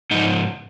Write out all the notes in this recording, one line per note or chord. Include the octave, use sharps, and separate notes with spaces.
G#2 F3 D#4